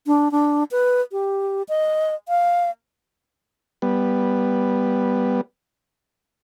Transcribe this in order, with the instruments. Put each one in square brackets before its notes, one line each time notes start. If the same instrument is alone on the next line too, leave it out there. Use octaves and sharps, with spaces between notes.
[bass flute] D4
D4
B4
G4
D#5
F5
[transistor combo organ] G3 B3